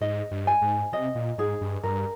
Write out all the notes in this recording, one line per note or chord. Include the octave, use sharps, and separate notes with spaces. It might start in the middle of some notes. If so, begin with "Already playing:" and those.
G#2 D#5
G2
G#5
G#2
C3 D#5
A#2
G#2 G#4
G2
G2 A#4